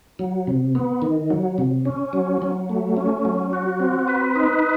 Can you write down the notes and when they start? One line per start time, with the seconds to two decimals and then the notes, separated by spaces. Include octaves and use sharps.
0.19 F#3
0.47 C3
0.75 B3
1.02 D#3
1.30 F#3
1.58 C3
1.85 C#4
2.13 F#3
2.42 F#3
2.69 A3
2.97 C#4
3.25 F#3
3.53 F#4
3.80 C4
4.08 B4
4.36 D#4